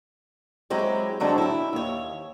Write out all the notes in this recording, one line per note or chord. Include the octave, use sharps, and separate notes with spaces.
F#3 G#3 C4 E4 G4
D3 F#3 G#3 C4 D4
E4 G4
D#2 C#5